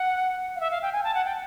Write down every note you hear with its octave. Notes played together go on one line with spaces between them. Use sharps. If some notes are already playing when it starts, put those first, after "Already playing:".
Already playing: F#5
F5
E5
F5
G5
G#5
A5
F#5
G5